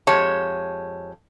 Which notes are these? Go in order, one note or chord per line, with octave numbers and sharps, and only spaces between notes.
F2 G#3 G4 C#5 A5